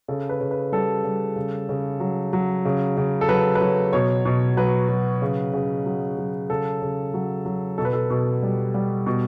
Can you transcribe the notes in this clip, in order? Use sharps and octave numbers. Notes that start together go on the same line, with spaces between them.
C#3 A4
B4
C#3
B4
G3 A4
G3
C#3
C#3
F#3
F#3
C#3
C#3
A4
F#3 B4
B4
F#3 C#5
B2 C#5
B2
F#3 B4
F#3
C#3
C#3
F#3
F#3
C#3 A4
C#3
F#3
F#3
B2 A4
B4
A4
B2
G3
G3
B2